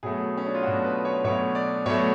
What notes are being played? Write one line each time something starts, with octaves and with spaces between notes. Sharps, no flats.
B2 F#3 A3 G#4
C#4
D4
F4
B2 F#3 A3 F#4
B4
C#5
B2 F#3 A3 C#5
D5
B2 F#3 A3 C#5